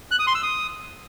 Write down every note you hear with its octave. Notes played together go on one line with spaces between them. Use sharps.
F#6
D#6
C6
E6
D#6